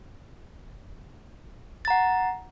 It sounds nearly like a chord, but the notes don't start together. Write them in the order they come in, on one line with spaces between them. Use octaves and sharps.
A6 A#5 F#5